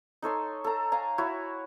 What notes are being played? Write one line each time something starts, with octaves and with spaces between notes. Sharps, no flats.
D#4 A4 C#5 C6
A4 A#5
F5 G#5 A#5
E4 F#4 C#5